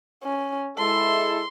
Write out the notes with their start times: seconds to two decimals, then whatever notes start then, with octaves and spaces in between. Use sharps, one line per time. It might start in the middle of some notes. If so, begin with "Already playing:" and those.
0.23 C#4
0.78 G#3 E4 A4 C6